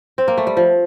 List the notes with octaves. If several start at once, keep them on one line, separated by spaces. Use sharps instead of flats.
C4
A#3
A3
G3
F3